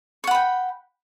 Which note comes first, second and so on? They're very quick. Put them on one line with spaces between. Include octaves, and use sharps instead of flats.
C#6 F#5 B5 G5